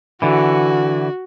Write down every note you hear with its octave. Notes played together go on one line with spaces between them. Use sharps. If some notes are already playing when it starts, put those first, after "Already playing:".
D3 E3 F#4